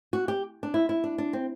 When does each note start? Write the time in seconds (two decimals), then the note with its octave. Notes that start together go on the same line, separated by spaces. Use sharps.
0.13 F#4
0.28 G4
0.63 D4
0.74 E4
0.89 E4
1.04 D4
1.18 D4
1.33 C4